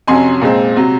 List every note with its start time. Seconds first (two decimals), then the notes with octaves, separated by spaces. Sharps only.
0.07 F2 C3 F#3 C#4 G#5 C6
0.41 A#2 G#3 C4
0.76 C3 F#3